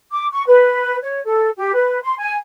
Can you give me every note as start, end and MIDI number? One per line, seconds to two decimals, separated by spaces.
0.11 0.27 86
0.32 0.42 85
0.46 0.97 71
1.02 1.20 73
1.24 1.48 69
1.57 1.73 67
1.74 1.99 71
2.03 2.14 84
2.19 2.34 80